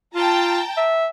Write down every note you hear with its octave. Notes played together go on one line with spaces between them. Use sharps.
F4 G5 A5 A#5
E5